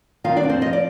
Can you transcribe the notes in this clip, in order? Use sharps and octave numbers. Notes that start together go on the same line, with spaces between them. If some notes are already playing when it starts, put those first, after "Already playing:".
D#3 F4 F5
D4 D5
F2
C4 C5
F3 D#5
D5